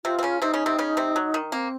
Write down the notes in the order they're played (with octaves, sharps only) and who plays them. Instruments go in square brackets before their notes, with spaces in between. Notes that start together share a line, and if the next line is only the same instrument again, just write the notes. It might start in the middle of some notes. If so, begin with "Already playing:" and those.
[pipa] C3 C4 [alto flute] F4
[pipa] C4
C#3 C#4
[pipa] C3 C4 [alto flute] D#4
[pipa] C#3 C#4
C3 C4
C#3 C#4
C3 C4
F#3
D#3
[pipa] A#3 [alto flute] C4